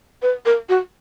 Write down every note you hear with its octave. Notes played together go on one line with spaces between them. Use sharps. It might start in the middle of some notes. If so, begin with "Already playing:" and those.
B4
A#4
F#4